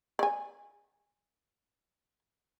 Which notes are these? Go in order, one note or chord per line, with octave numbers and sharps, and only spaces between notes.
D5 G#5